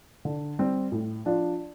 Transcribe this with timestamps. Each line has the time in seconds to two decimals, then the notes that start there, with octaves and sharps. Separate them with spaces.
0.25 D3
0.59 G3 C4
0.92 A2
1.25 F3 D4 F4